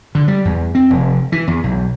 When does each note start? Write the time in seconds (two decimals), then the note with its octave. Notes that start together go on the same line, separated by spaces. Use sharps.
0.15 D3
0.28 G3
0.45 E2
0.75 C4
0.90 F1
1.32 E3
1.48 E2
1.64 B1